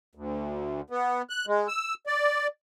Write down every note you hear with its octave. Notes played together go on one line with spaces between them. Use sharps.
D2
B3
F#6
G#3
E6
D5